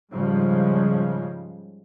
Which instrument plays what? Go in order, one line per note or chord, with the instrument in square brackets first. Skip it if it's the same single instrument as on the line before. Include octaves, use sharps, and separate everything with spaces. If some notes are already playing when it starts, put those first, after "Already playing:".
[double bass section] G#2 C#3 F3 G3 G#3